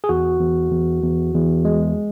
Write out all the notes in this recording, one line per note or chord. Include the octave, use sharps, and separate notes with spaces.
G#4
E2 F#4
E2
E2
E2
E2
G#3